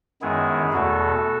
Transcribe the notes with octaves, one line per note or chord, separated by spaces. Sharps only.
F#2 D#3 G#3 B3 E4 G#4
E2 B2 A3 F#4 A4